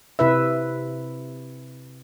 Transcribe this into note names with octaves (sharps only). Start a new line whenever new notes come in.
C3 E4 B4 E5